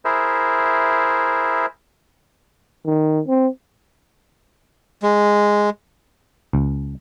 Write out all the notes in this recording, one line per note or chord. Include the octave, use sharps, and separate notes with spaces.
E4 G#4 A#4 C5 E5
D#3
C4
G#3
C#2